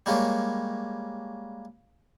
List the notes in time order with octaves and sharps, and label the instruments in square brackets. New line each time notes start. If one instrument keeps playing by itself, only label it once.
[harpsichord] G3 G#3 A#3 C#4